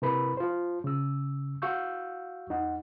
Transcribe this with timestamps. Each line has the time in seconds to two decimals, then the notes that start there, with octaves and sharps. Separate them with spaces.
0.02 C3 E4 A#4 B4 B5
0.37 F4 C5
0.84 C#3 E6
1.62 F#4 F5 C#6 E6 G6
2.49 E2 D#4 F#5